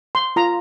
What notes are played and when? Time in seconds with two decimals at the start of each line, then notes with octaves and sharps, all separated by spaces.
0.15 C6
0.36 F4 A#5